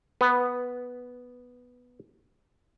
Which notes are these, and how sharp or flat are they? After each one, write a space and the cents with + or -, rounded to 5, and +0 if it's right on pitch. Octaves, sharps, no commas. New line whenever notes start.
B3 +0 B4 +15